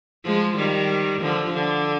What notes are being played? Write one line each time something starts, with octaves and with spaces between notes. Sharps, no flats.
F3 G#3
D#3 G3
D3 F3
D3